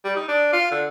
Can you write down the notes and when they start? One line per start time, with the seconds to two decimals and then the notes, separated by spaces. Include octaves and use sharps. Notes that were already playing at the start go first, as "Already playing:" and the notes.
0.04 G3
0.16 D#4
0.28 D4
0.53 F4
0.71 D3